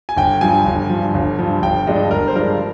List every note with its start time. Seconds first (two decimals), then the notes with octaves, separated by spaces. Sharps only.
0.09 G#5
0.17 G1 G5
0.41 G2 F3 G#5
0.66 G1
0.89 G2 F3
1.14 G1
1.39 G2 F3
1.62 G1 G5
1.87 G2 F3 G#3 D4 D#5
2.11 G1 A#4
2.28 C5
2.35 G2 F3 G#3 D4 A#4